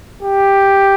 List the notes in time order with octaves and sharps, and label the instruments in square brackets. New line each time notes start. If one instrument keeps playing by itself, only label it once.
[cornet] G4